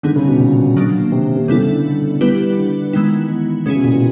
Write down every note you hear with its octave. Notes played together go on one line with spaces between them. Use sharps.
D3 G3 B3 D#4 G#4
C#3
B2
A#2
D#3 F#3 A#3 D4
C3
C3
C#3 G3 B3 E4 A4
D3
G3 B3 E4 G4 B4
D3
D#3 E3 G#3 B3 E4
D#3
C#3 G#3 C#4 E4 G#4
B2
A#2
B2